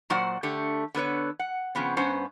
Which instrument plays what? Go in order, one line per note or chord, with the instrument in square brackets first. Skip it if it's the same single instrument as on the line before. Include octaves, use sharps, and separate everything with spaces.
[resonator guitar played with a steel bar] A#2 F#3 F#4 C5 D5 F#5
D3 A3 G4
D3 B3 B4 C#5
F#5
C#3 F3 B3 C4
G2 B3 C#4 C5 A#5